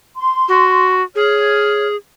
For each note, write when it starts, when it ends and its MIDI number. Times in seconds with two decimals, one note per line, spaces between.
0.16 0.92 84
0.49 1.02 66
1.16 1.96 68
1.16 1.88 73
1.16 1.88 89